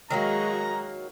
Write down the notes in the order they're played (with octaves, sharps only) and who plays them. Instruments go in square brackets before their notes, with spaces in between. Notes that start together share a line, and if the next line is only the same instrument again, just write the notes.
[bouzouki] D#3 F#3 A#3 [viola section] G#3 F#4 D#5 [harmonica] A#5